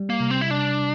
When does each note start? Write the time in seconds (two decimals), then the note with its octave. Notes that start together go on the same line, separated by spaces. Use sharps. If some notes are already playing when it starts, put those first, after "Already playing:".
Already playing: G3
0.10 A#3
0.20 C3
0.30 C4
0.41 E4
0.50 C3 D4